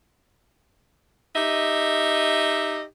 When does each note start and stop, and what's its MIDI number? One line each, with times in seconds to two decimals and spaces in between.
1.36 2.83 63
1.36 2.83 67
1.36 2.83 75
1.36 2.83 76